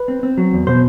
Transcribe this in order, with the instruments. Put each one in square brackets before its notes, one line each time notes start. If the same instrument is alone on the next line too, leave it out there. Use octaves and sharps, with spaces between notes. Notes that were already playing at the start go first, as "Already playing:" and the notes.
Already playing: [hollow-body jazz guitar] B4
C4
C4
F#3
E2
B2 C5